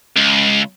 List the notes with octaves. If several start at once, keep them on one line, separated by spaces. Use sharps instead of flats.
C#2